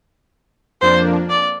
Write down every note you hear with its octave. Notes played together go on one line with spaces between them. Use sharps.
F2 F3 A#3 D4 C5
D5